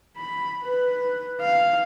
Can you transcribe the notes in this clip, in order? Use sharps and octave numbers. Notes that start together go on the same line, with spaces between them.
B5
B4
F5